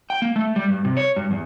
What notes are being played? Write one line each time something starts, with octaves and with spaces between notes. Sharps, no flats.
G5
A#3
A3
G3
G2
C3
C#5
G2
E2